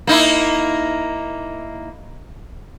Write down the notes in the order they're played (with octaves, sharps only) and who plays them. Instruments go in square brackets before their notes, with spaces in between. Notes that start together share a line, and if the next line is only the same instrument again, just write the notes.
[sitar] A#3 D#4 E4